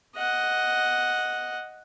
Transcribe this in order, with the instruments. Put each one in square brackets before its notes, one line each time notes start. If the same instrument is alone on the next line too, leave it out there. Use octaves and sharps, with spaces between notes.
[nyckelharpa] D#5 F#5